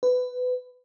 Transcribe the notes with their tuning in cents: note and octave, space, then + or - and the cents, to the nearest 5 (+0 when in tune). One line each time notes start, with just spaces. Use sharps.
B4 +20